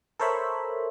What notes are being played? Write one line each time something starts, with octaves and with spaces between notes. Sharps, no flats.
A4 A#4 C5 C#5 E5 B5